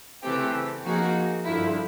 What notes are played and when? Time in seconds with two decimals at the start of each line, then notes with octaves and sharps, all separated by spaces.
0.23 C#3 E3 A3 C4 G4
0.84 F3 A#3 D#4 F#4 G#4
1.45 G2 D3 F3 E4